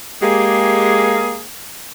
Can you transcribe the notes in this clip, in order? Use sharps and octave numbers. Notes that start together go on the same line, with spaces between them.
G#3 A#3 G4 G#4